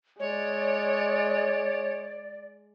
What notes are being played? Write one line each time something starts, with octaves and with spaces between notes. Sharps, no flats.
G#3 C#5 D5